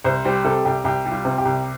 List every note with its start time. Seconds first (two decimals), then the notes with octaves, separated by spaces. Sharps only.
0.04 C2 C5
0.25 G3 C5
0.45 C3 A4
0.65 C2 G4
0.84 C2 G4
1.06 G3
1.11 F4
1.25 C3
1.38 G4
1.45 C2